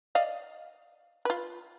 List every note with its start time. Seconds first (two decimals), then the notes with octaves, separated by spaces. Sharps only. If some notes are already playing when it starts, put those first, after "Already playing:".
0.15 D5 D#5 F5
1.25 F4 B4